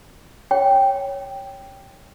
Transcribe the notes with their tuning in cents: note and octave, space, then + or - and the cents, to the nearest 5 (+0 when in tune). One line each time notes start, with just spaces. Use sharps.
C#5 +0 G5 +0